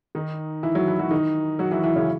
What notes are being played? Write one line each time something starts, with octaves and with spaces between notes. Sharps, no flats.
D#3 D#4
E3 E4
F#3 F#4
E3 E4
F#3 F#4
D#3 D#4
F#3 F#4
E3 E4
E3 E4
C#3 C#4